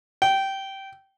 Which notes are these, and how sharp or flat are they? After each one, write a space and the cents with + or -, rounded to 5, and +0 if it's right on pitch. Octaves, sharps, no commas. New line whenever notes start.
G5 -15